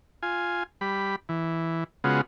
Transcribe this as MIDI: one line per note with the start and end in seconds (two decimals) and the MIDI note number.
0.23 0.63 65
0.23 0.63 80
0.81 1.16 55
0.81 1.16 83
1.29 1.84 52
2.04 2.21 49
2.04 2.21 56
2.04 2.21 59
2.04 2.21 65
2.04 2.21 66